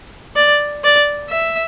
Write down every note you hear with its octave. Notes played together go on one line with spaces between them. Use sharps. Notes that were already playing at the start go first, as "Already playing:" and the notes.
D5
D5
E5